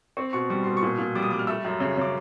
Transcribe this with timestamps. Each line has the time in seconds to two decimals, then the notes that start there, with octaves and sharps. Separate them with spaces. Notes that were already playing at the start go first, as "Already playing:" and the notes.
0.17 C4 C#6
0.33 B2 C#6
0.50 G3 C#6
0.64 B2 C6
0.77 C#6
0.82 A#2
0.98 A#2
1.15 G3 D6
1.22 D#6
1.31 G3 D6
1.39 F6
1.47 A3 E6
1.65 F#2
1.80 C#3
1.97 C#3 D6